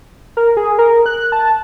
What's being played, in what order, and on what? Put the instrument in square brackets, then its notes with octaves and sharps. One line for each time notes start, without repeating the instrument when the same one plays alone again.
[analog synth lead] A#4
G#4
A#4
F#6
A5